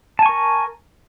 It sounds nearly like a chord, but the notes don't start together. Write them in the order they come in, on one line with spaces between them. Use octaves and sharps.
A5 G#5 C#6 A#4